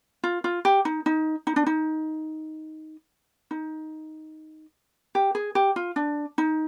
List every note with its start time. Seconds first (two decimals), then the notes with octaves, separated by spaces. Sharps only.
0.24 F4
0.44 F4
0.65 G4
0.85 D#4
1.06 D#4
1.47 D#4
1.56 D4
1.66 D#4
3.51 D#4
5.15 G4
5.35 G#4
5.55 G4
5.76 F4
5.96 D4
6.38 D#4